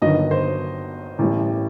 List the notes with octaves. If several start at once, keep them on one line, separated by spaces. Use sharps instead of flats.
G1 G2 D#3 F#3 D#5
C5
A1 A2 G3